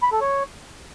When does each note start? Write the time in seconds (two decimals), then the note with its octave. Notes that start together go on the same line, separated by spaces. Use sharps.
0.03 B5
0.12 A4
0.21 C#5